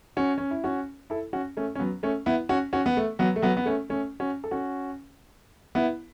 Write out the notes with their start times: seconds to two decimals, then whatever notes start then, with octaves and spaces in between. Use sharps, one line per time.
0.17 C#4 F#4
0.38 C#4
0.51 E4
0.64 C#4 F#4
1.10 E4 A4
1.33 C#4 F#4
1.57 A3 C#4
1.75 C#4
1.79 F#3 B3
2.03 A3 C#4
2.26 B3 E4
2.49 C#4 F#4
2.73 C#4 F#4
2.86 B3
2.97 A3
3.19 F#3 B3
3.36 A3
3.42 F#3 B3
3.57 B3
3.66 A3 C#4
3.89 A3 C#4
4.20 C#4 F#4
4.44 A4
4.51 C#4 F#4
5.75 B3 E4